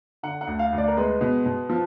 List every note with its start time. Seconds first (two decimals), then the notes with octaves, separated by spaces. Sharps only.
0.23 D3 F#5
0.41 F#5
0.47 D2
0.59 F5
0.73 D2
0.78 D5
0.88 A#4
0.97 G#3 B4
1.21 B2
1.46 B2
1.69 F3